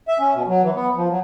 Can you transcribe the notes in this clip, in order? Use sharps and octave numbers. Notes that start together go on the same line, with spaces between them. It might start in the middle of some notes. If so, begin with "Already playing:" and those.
E5
C#4
B2
F#3
E3
B3
F3
F#3